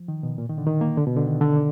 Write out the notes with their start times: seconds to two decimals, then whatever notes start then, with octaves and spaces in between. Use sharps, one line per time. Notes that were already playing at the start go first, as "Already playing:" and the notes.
Already playing: F3
0.08 D#3
0.23 B2
0.38 A#2
0.49 D#3
0.58 D3
0.67 D#3
0.81 A#3
0.97 D3
1.06 B2
1.16 D3
1.26 D#3
1.41 D3